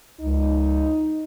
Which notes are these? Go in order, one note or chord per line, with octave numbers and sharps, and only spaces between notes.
C#2 D#4